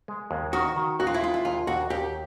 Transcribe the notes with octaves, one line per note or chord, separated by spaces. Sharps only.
G#3
D#2
D#3 F#4
D#3
D#2 F#4
F4
E4
G#3 F4
E4
D#2 F4
D#2 F#4
D#2 G4